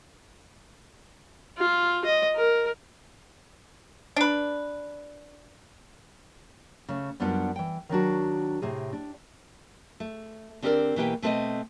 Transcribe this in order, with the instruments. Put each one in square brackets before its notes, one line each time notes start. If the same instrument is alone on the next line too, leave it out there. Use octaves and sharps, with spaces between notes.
[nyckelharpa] F4
D#5
A#4
[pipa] D4 B4
[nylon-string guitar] C#3 A3
F#2 G3 B3 D4 F4 F#5
E3 G5
D#3 F#3 D4 F#4
A2 C3 G#4
D4
A3
D3 C4 G4 G#4 A#4 D5
B2 E3 A#3 G4 B4 G5
B2 A3 C4 A4 B4 D#5